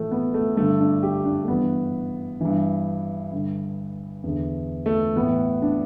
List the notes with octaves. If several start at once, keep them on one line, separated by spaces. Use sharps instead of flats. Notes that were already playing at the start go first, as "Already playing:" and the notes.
Already playing: A2 E3 A3
B3
A3
G2 D3 A3
D4
G4
D4
A3
G2 E3 B3
G2 E3
G2 D3
E2 D3
A3
A2 E3 B3
D4